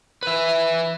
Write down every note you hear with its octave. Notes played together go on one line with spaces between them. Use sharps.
B4 E5